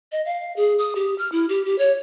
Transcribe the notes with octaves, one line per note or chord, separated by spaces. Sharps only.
D#5
F5
G#4
D#6
G4
F6
E4
G4
G4
C#5